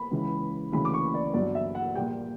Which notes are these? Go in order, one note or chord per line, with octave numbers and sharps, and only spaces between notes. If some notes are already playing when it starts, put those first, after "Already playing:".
Already playing: B5
C#2 C#3 E3
D2 C#3 E3 B5
D6
C#6
D5
G1 G2 F#3 D5
E5
F#5
A#1 A#2 G3 G5